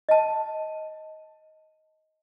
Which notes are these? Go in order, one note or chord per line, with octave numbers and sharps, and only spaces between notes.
D#5 A5